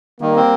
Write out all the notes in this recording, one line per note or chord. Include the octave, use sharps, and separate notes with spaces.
D#3 G3 A#3
C4